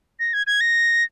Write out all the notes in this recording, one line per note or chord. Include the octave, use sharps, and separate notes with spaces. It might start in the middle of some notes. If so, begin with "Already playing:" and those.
A#6
G#6
G#6
A#6